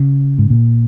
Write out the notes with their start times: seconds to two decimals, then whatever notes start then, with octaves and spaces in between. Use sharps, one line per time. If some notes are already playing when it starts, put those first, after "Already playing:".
Already playing: C#3
0.38 G#2
0.50 A#2